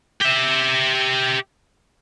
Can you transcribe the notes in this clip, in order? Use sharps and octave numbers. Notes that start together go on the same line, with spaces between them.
G4 E5